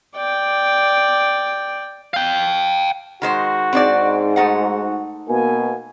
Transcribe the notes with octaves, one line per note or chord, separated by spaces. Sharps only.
D5 G5
F5 G5
D#3 G#3 F#4 C5
G#2 C4 D4 D5
A3 D#4 F#4 F#5
B2 A#3 G#5